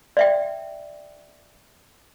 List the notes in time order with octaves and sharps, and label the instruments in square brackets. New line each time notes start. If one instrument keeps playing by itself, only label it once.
[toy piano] D5 E5 G5